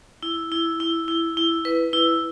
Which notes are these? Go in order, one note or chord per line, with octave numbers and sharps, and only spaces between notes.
E4
E4
E4
E4
E4
B4
E4